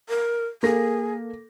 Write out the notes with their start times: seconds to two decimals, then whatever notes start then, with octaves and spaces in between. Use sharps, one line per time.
0.09 A#4
0.63 A#3 G#4 A4 A#6